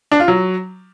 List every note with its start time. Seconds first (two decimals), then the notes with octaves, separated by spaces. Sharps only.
0.12 D4
0.20 F4
0.28 F#3